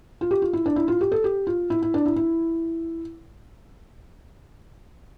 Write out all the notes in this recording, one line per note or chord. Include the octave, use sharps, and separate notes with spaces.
F4
G4
F4
E4
D4
E4
F4
G4
A4
G4
F4
E4
E4
D4
E4
E4